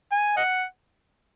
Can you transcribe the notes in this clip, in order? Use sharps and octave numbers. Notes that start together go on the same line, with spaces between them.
G#5
D#5 F#5